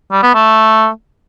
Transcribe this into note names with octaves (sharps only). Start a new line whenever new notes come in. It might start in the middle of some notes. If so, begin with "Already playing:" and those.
G3
B3
A3